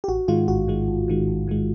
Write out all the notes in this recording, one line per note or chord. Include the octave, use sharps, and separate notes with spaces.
G4
A1 F#4
G#2 D#3 G#3 F4
A1 F#4
G#2 D#3 G#3
A1
G#2 D#3 G#3
A1
G#2 D#3 G#3